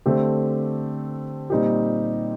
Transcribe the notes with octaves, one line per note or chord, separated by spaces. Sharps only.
D3 A3 C4 G4
A#2 G3 C4 D#4 G4